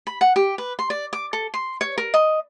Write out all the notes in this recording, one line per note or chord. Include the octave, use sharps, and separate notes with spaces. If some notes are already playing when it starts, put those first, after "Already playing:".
B5
F#5
G4
B4
C6
D5
D6
A4
C6
C#5
A#4
D#5